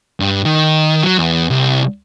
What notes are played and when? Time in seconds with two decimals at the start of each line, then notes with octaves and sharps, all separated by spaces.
0.20 G2
0.45 D#3
1.03 F#3
1.19 E2
1.50 C2